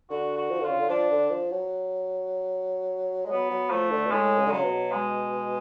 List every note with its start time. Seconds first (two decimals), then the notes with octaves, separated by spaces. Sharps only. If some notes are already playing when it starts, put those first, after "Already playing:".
0.10 D3 F#4
0.37 F#4
0.50 F3
0.60 D3 F4
0.69 C#3
0.79 D3
0.89 F3 D4
1.10 D3
1.30 F3
1.51 F#3
3.25 G#3
3.31 F#3 B3
3.51 F#3
3.70 F3 A3
3.90 D3
4.06 B2
4.11 A2 G#3
4.38 C#3
4.46 D3
4.51 C#3 F#3
4.64 B2
4.92 G#3